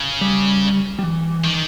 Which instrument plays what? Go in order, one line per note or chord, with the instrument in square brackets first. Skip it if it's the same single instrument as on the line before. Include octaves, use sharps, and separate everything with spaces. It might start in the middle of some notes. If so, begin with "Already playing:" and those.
Already playing: [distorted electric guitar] C#3
[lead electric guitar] G3
G3
E3
[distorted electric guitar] D#3